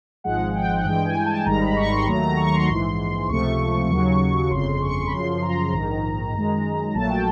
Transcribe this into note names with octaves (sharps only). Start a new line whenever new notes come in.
G#1 G#2 F3 G#3 F#5
G5
F#5
G2 E3 G#3 G5
G#5
A5
G#1 G#2 D#3 G3 A#5
B5
C#6
C6
D#2 D#3 F#3 A3 A#5
A#5
C#6
C6
A#1 G#2 E3
C#2 C3 F3 A3 C#6
D#2 C#3 F#3
G1 F2 C#3 C6
C#6
B5
F#2 C#3 F3 C6
A#5
A#1 G#2 D#3
F#2 D#3 G#3
A#1 A#2 F#3 A3 A5
G5